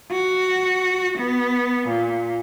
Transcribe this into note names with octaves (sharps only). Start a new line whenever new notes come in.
F#4
B3
A#2